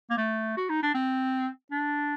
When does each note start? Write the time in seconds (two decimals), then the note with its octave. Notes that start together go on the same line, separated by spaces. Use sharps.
0.10 A#3
0.17 A3
0.57 F#4
0.69 D#4
0.82 D4
0.94 C4
1.71 D4